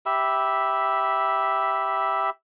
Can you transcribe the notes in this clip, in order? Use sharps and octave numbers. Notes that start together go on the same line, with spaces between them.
G4 E5 B5